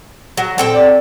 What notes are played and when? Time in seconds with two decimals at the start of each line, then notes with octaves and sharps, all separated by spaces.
0.37 F#3
0.58 A#2 C4 A4 G5
0.75 D5